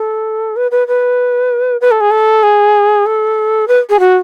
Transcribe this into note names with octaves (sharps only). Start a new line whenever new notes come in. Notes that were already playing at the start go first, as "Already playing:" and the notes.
Already playing: A4
B4
B4
B4
B4
A4
G#4
A4
G#4
A4
B4
G#4
F#4